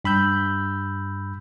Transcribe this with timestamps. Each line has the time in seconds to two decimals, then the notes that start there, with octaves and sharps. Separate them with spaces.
0.04 G2 B5 E6 G6